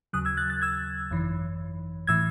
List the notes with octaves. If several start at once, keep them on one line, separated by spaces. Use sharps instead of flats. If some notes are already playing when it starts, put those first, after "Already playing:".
D#2 C#3 F#3 D#6 F#6
E6 G#6
F#6 A6
F#6 A6
E6 G#6
G#1 F#2 E3
A2 E3 E6 G#6